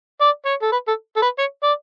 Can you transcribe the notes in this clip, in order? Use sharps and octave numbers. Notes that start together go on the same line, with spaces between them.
D5
C#5
A4
B4
A4
A4
B4
C#5
D5